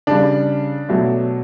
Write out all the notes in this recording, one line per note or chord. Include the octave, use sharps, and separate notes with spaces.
C#3 G3 D4
B2 F#3 A3